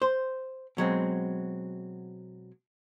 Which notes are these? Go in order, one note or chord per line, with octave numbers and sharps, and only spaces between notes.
C5
B2 F#3 G#3 C4